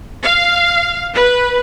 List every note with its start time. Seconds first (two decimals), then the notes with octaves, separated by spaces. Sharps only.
0.23 F5
1.14 B4